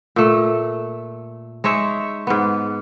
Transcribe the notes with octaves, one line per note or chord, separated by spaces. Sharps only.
A#2 A3
G#3 D#4 C#5 E5
G#2 B3